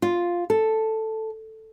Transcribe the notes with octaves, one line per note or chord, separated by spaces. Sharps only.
F4
A4